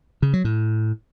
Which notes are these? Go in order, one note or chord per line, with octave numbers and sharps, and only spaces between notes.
C#3
F#3
A2